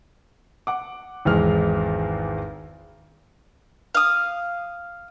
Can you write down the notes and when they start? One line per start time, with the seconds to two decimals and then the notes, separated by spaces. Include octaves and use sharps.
0.67 F#5 D6
1.25 G#1 E2 G#3 F6
3.95 F5 D#6